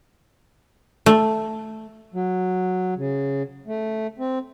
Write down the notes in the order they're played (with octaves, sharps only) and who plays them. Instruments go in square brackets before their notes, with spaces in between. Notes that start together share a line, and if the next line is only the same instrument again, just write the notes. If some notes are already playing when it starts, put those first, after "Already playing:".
[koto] A3
[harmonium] F#3
C#3
A3
C4